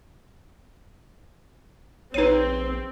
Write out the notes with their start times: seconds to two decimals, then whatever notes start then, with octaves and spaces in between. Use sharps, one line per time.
2.14 A#1 C4 D#4 B4 C#5 C7 D#7